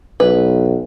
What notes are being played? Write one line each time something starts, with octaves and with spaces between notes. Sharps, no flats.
B1 B4